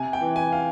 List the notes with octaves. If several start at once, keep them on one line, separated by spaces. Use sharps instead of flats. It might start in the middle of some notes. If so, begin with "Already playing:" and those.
Already playing: C3 G#5
G5
E3
G#5
F5